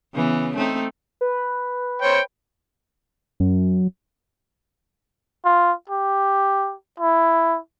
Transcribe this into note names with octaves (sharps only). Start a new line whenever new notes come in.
C#3 E3 B3
A3 C4 D#4
B4
C5 C#5 G5
F#2
F4
G4
E4